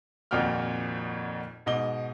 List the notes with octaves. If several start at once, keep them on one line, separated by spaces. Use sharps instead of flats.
G#1 F2 A#2 F#4 G5 F6
G#2 B2 D#5 D6 G7